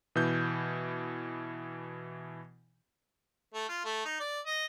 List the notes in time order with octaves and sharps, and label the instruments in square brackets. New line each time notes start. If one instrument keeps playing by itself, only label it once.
[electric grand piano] B2 E3 G6
[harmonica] A3
F4
A3
D#4
D5
D#5